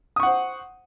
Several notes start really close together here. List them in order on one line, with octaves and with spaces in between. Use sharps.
D#6 C#6 F#5 C5